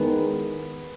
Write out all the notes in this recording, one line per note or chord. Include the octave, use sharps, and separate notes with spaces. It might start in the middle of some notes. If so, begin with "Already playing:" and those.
Already playing: E2 D#3 G#3 B3